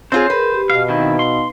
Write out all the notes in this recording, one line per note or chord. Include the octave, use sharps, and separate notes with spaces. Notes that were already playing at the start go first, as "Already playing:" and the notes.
C4 F4 G#4 C5 C#5
G#4 A#4 B4
G4
B2 F5
D#3 B3 C4 D#4 E4 F5
C6